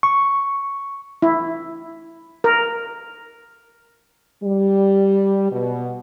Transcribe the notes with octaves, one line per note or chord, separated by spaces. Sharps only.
C#6
E4
A#4
G3
B2